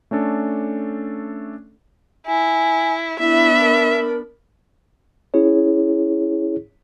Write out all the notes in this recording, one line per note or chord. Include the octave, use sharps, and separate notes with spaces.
A3 C#4 D4 A4
E4 G#5
B3 D4 E4 E5 B5
A#4
C#4 E4 G#4 C#5